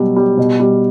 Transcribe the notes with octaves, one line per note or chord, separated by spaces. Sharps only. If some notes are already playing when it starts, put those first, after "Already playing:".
Already playing: B2 F#3 G3
G3
B2
G3